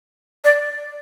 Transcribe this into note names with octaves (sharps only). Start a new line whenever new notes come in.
D5